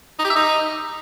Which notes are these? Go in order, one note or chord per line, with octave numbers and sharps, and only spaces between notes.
D#4
G4
E5
D#4